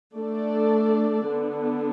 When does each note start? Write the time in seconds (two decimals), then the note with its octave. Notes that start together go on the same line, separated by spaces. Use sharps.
0.16 A3 D4 A4 D5
1.27 D3 B3 D4